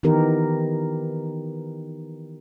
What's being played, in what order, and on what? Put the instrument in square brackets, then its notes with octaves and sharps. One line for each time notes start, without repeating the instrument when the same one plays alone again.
[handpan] D#3 E3 B3 D#4 G4 A#4